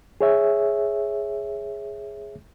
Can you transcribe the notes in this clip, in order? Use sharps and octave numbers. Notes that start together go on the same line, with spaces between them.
G#4 C#5 E5